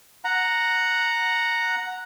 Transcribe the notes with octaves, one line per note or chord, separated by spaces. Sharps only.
F#5 A#5